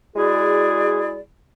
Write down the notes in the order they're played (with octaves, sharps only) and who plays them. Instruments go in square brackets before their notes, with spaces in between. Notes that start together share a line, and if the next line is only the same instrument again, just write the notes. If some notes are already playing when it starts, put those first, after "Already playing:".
[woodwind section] G#3 E4 F#4 G#4 D5